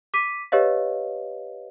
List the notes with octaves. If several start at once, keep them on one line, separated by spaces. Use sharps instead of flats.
D6 B6 D#7
G4 B4 C#5 D#5 F5